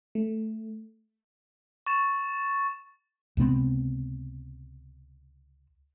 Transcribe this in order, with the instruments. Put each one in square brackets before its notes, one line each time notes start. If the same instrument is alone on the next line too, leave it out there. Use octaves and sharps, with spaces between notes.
[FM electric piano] A3
[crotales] C#6 A6 E7
[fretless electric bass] C#2 C3 B3 C4